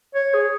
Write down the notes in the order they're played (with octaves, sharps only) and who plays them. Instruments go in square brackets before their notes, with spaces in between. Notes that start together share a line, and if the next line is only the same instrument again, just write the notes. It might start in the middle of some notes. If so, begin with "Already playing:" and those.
[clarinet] C#5
G#4